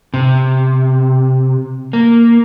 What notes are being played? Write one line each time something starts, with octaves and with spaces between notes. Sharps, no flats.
C3
A#3